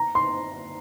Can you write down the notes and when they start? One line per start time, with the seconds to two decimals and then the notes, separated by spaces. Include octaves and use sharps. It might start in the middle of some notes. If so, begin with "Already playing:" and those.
Already playing: A#5
0.15 C6